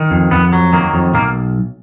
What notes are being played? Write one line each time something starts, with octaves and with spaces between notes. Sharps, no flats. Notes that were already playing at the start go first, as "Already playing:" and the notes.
Already playing: D#3
F2
F2 B3
F#3
D#3 A#3
F2
B1 A#3